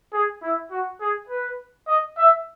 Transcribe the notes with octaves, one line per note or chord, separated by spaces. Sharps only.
G#4
E4
F#4
G#4
B4
D#5
E5